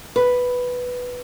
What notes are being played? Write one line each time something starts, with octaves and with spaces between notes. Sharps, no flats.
B4